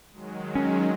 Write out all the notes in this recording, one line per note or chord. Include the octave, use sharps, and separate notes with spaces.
D#3 F#3 G#3
C#4